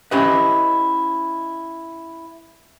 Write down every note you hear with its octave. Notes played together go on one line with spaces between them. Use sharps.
C#4 E4 G4 B4 D#5